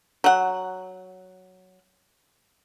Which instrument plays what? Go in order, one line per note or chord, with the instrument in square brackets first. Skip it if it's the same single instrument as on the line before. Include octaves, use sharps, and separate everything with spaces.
[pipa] F#3 F#5